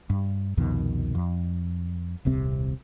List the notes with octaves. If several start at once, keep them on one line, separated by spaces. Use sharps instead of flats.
G2
C2 F2 B2 D#3
F2
D#1 C2 C3 C4